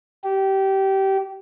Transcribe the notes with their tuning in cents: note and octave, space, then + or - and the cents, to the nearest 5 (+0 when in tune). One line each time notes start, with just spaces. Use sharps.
G4 -20